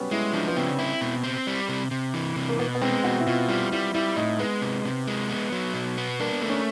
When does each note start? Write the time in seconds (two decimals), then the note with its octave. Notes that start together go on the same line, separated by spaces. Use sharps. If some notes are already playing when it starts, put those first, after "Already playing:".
Already playing: F#3 G3 B3 C#4
0.11 G#3 E4
0.33 F3 D4
0.48 B3
0.56 C#3 C4
0.79 E4
1.01 B2
1.24 C4
1.47 G3
1.69 C3
1.91 C3
2.14 E3
2.36 C3
2.49 A#3
2.59 B2 B3
2.75 B3
2.82 G#3 C4
3.04 B2 F#4
3.20 E4
3.27 B2 F4
3.49 G3 F4
3.72 G3 E4
3.94 G3 E4
4.16 A2 D#4
4.39 G#3 B3
4.62 C3
4.85 C3
5.07 G#3
5.29 B3
5.52 F#3
5.74 B2
5.98 B3
6.20 A#3 D4
6.42 A3
6.49 C#4